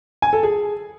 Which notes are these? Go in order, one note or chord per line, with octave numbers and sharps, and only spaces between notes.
G#5
A4
G#4